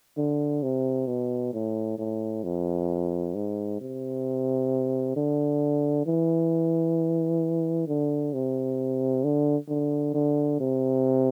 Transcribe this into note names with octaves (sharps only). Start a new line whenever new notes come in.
D3
C3
B2
A2
A2
F2
G#2
C3
D3
E3
D3
C3
D3
D3
D3
C3